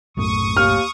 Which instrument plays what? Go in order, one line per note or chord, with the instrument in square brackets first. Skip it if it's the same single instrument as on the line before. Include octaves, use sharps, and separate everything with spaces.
[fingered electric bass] B1 F#2 A2 [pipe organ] C#6 D#6
[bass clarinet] D#2 [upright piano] F6